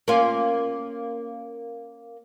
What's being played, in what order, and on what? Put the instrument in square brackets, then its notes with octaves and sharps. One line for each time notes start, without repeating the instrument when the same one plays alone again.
[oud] A#3 C#4 F4